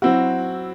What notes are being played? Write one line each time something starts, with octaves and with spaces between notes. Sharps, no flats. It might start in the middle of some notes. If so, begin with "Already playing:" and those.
F#3 C4 E4 F#4